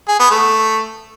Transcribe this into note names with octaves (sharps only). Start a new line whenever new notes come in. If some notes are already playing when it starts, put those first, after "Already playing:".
G#4
B3
A3